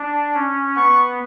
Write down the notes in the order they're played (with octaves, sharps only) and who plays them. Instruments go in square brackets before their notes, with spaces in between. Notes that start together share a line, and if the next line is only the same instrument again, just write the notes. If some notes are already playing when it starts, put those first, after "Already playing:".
Already playing: [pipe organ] D4
C#4
[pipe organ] B3 [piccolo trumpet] C#6